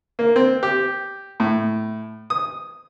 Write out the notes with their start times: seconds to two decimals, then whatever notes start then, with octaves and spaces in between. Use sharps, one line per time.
0.19 A#3
0.36 C4
0.63 G4
1.40 A2
2.30 D#6